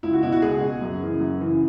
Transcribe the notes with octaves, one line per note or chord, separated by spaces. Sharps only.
C#2 E4
F#4
B2 E4
F#4
C#2 G#4
B2
F#2
C#3 E3
F#2
C#3 E3